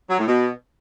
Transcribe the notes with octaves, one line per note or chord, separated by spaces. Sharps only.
F#3
A2
B2